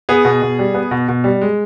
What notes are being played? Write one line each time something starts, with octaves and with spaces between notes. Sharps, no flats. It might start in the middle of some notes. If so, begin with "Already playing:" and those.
B3 G#4
B2
B2
G3
B3
B2
B2
G3
G#3